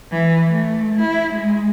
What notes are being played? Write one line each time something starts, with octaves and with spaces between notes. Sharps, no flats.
E3
A3
E4
G#3